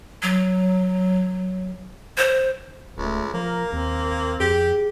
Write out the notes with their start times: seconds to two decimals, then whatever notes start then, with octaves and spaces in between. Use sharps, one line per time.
0.23 F#3
2.18 C5
2.98 D1 C#2 A3
3.34 F3 A#3 A#4
3.73 D#2 C4
4.40 F2 G4 G#4